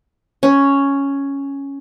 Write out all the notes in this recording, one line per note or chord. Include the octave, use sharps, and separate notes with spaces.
C#4